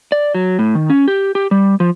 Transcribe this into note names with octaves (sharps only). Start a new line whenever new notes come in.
D5
F#3
A2
D#3
C#4
G4
G4
G3
F3